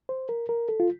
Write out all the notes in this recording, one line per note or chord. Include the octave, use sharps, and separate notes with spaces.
C5
A#4
A#4
A4
F4